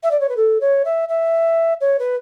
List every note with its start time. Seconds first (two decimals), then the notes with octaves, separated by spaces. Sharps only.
0.03 E5
0.11 D5
0.20 C#5
0.29 B4
0.36 A4
0.60 C#5
0.85 E5
1.08 E5
1.80 C#5
1.99 B4